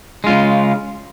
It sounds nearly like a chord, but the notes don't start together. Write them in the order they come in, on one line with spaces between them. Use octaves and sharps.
G#3 F4 C#3